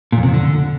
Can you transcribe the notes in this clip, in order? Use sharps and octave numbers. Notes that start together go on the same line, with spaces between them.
A#2
F2
C3
F2
D3